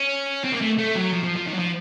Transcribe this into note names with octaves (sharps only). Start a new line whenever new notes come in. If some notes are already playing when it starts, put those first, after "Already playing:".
Already playing: C#4
C4
A#3
A3
A3
F#3
F3
F3
F3
D#3
F#3
F3